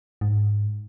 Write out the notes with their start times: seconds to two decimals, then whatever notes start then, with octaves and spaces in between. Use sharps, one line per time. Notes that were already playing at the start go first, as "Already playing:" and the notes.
0.21 G#2